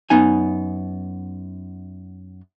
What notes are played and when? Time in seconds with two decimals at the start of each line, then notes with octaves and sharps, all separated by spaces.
0.10 F#2 B3 D#4 G#5